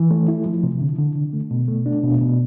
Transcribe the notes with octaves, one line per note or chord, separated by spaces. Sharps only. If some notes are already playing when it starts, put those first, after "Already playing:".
Already playing: E3
A3
E4
F3
C3
D3
D3
D3
A3
B2
A3
D4
B2
B2